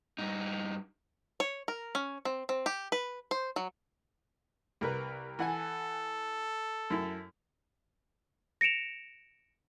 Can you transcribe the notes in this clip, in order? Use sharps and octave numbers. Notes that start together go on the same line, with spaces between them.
G2 D#4
C#5
A#4
C#4
C4
C4
G4
B4
C5
F#3
C2 A#4 B4
E3 A4 F#5 G#5
F#2 E4
A#6 C#7 D7 E7 F7